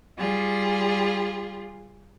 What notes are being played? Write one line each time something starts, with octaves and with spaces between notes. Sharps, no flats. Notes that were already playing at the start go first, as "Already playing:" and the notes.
G3 F4 G#4